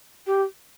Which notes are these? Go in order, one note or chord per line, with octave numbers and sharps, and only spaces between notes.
G4